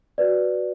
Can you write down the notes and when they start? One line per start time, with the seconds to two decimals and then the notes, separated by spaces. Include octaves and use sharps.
0.18 F#4 B4 D5